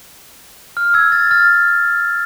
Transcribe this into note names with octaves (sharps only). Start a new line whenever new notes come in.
F6
E6 G#6
F6 A6
F6 A6